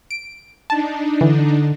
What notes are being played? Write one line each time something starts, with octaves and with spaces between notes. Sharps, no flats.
D7
D4 D#4 A5
D3 E3